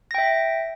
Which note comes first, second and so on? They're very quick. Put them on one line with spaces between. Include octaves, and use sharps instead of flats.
A#6 G5 E5